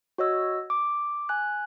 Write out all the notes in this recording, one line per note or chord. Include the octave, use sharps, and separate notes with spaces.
F#4 C#5 D#5 E6
D6
G#5 F#6